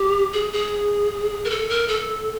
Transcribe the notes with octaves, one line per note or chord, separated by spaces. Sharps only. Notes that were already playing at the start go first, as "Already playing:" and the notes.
Already playing: G4
G#4
G#4
A#4
A4
A#4
A4